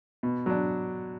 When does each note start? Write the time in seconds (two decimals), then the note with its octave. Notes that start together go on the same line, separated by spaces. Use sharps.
0.23 B2
0.46 F#3 D4